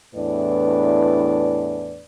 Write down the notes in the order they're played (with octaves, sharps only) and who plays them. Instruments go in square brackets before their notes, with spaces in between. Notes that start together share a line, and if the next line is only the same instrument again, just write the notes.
[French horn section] E2 A2 D4 B4 D5